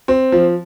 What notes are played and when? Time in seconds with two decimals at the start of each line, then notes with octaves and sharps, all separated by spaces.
0.08 C4
0.32 F3